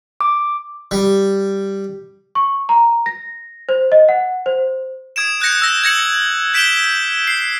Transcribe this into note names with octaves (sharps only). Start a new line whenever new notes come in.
D6
G3
C#6
A#5
A#6
C5
D#5
F#5
C5
D#6 G#6 D7 E7
D#6 F#6 G6 A#6 C#7
E6 A#6
G#6 A#6 C#7 F#7
G6 B6 D7 E7 F#7 G7
C7